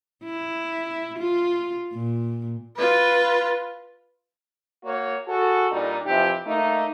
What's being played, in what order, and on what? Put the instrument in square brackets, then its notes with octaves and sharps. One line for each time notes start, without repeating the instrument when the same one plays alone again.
[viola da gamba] E4
F4
A#2
[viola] F4 B4
[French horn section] A#3 F#4 C#5
F#4 G#4 A4
A#2 G3 D4 D#4
F2 C3 E3 F3 G4
A3 A#3 D#4